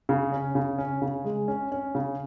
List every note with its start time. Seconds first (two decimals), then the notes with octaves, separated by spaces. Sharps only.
0.09 C#3
0.32 C#4
0.55 C#3
0.78 C#4
1.02 C#3
1.25 G#3
1.48 C#4
1.72 C#4
1.95 C#3